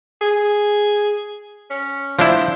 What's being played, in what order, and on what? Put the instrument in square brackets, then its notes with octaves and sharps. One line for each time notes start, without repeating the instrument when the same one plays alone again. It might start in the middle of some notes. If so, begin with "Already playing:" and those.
[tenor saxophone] G#4
C#4
[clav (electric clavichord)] F3 D4 E4 [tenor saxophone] C5